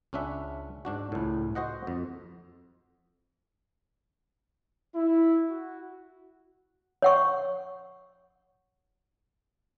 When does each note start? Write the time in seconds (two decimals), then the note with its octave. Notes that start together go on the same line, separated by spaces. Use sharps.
0.13 C#2 C#4 D4 E5 F#5
0.85 G#2 D4 F#4
1.12 C#2 A2
1.55 F#4 C5 D#5 F#5
1.87 F2
4.95 E4
5.50 F#4
7.02 C#5 F#5 C#6